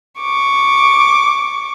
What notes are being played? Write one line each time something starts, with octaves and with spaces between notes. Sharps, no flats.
C#6 D6